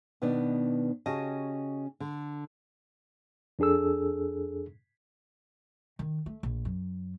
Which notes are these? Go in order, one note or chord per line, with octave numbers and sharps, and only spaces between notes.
B2 D#3 B3 D4 D5
C#3 C#4 F#4 G4 D#5 A5
D3
F2 D4 G#4 A4 E6
D#3
A3
A#1
F#2